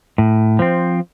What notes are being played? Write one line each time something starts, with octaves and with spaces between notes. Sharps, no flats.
A2
F3 C4